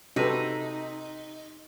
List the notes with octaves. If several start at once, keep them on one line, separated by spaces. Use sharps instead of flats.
C3 D#4 F#4 A4 B4